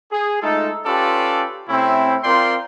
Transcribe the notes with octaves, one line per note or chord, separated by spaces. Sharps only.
G#4
G#3 A3 D#4 F4 A4
C#4 F4 G4 A4 B4 D5
C3 A3 C4 C#4 E4
C4 F4 A#4 D5 G5 C6